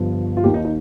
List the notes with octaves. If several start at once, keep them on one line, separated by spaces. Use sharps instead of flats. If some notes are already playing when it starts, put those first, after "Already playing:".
Already playing: G1 G2 F3
F4
D#2 D#3 G4
D#4
D#4